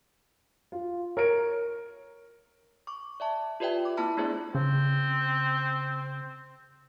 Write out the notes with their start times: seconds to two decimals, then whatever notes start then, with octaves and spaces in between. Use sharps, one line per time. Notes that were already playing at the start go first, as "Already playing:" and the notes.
0.72 F4
1.17 A#4 C#5 D7
2.87 C#6 D6
3.20 D5 E5 A5
3.60 F4 G4 B4 D5 E5 G5
3.85 D6
3.97 A#3 C4 E4 A5 B5 F6
4.17 A3 B3 D4 G#4 C5 D5
4.55 C#3 C4